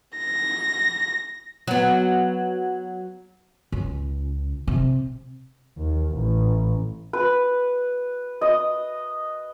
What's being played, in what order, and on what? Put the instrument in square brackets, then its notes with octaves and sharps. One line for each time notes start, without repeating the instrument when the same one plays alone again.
[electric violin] A#6
[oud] F#3 B3
[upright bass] C#2
C3
[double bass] D#2
A1
[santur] B4
D#5